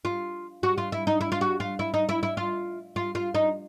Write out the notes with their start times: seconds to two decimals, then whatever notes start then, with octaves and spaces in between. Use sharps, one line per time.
0.05 F4
0.63 F#4
0.78 F4
0.92 E4
1.07 D#4
1.21 E4
1.32 F4
1.41 F#4
1.60 F4
1.79 E4
1.94 D#4
2.09 E4
2.23 E4
2.37 F4
2.96 F4
3.15 F4
3.35 D#4